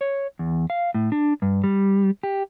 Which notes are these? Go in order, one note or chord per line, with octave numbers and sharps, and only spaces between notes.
C#5
E2
F5
A2
D4
G2
G3
G4